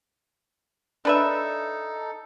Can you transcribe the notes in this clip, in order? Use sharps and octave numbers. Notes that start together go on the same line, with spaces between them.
D4 D#4 A4 B4 E5